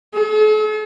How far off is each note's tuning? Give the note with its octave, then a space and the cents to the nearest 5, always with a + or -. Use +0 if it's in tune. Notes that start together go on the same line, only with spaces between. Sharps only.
A4 -45